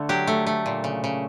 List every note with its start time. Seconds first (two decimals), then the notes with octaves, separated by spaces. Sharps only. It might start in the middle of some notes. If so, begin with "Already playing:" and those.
Already playing: D3 A3
0.09 F#3 G4
0.27 A3
0.47 A3
0.66 A#2
0.84 C#3
1.04 C#3